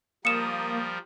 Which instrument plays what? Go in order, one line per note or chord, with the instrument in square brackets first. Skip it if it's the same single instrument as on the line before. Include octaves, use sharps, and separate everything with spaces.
[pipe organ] F3 G3 A#4 [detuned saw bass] A#3 [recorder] D#6 [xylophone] C#7 E7